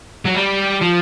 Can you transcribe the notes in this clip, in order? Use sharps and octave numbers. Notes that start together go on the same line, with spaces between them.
F#3
G3
F3